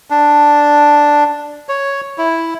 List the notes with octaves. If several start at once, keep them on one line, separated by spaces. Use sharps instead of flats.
D4
C#5
E4